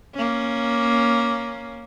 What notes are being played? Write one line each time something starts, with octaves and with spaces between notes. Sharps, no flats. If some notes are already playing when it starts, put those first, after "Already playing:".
A#3 C#4